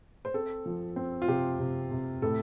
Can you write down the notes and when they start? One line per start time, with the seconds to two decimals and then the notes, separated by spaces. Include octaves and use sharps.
0.25 C5
0.34 C4 A4
0.66 F3
0.96 C4
1.22 F4
1.28 C3 G4
1.59 C3
1.91 C3
2.22 A2 A4